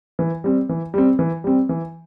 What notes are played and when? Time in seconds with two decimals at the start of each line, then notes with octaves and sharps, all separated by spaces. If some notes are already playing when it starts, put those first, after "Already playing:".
0.19 E3
0.44 G3 C4
0.69 E3
0.94 G3 C4
1.19 E3
1.44 G3 C4
1.69 E3